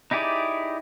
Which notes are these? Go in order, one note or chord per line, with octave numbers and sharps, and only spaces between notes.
D#4 E4 G4 G#4 D5